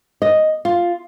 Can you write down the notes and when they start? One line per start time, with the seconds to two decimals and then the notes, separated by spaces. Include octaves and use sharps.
0.22 D#5
0.65 F4